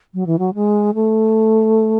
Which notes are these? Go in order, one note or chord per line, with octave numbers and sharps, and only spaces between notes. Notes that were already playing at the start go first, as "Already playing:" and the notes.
F#3
E3
F#3
G#3
A3